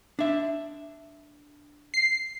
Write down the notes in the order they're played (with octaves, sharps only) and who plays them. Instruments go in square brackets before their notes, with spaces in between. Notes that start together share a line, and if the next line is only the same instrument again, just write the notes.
[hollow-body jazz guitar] D4 E5
[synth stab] C7